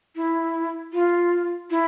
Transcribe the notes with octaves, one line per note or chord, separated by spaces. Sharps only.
E4
F4
E4